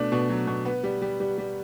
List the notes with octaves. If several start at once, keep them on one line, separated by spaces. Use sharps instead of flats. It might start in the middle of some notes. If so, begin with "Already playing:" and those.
Already playing: B2 A3 D4
B2
F#3
B2
B3
G3
G3
G3
G3